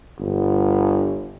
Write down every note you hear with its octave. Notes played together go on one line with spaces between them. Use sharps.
G1